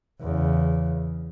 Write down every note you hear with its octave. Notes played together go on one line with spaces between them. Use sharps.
E2 C#3